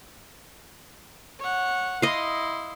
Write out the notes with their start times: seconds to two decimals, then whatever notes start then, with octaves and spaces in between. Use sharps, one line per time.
1.39 C#5 F#5
2.02 E4 D#5 F5 C6